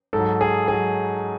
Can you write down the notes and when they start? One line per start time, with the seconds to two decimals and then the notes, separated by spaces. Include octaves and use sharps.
0.13 G#2 A4
0.18 F#3
0.41 G#4
0.68 F#3 G#4